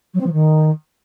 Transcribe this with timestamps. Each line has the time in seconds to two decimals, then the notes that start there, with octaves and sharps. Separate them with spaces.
0.14 F#3
0.20 C4
0.26 F3
0.32 D#3